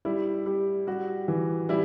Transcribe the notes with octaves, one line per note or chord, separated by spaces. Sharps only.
G3 E4
G3 G4
G3 F#4
E3
G3 E4